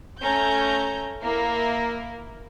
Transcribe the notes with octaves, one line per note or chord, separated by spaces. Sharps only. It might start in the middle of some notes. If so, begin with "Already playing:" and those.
A3 C#4 A#5 G6
A#3 E4 A#4